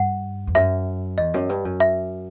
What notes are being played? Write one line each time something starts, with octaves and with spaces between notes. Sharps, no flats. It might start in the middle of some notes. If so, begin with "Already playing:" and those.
Already playing: G2 F#5
E2
F#2 E5
E2 D#5
F#2
G2
F#2
E5